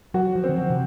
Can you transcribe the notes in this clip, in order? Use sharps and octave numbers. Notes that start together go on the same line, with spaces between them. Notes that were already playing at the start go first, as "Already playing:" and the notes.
F#3 F#4
F3
C4
D#3
F3
C3